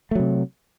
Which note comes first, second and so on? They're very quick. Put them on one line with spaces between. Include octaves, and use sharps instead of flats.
A3 F#3 C3